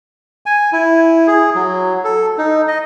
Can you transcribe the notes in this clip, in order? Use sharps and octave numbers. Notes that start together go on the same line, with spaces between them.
G#5
E4
G#4
F#3
A4
D#4
D#5